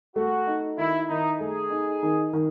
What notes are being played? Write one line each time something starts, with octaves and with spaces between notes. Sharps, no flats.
A3 F#4
D#4
D#3 E4
D#3 D#4
A3 G#4
D#4
D#3
D#3